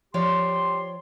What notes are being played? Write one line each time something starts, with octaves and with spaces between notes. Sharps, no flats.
F3 G4 C#5 D5 C6